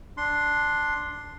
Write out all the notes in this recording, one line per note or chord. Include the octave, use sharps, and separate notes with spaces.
D4 C6